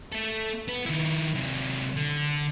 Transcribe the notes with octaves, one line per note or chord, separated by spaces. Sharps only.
A3 A4
B3 B4
D#3 E4
C3 F#3
D3